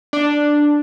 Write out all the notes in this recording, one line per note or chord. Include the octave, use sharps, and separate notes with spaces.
D4